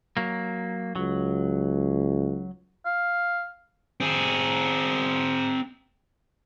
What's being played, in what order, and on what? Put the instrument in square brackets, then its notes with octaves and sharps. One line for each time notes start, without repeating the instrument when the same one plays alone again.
[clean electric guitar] F#3 A#3
[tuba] C#2 [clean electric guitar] F#3
[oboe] F5
[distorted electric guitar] C4 G#4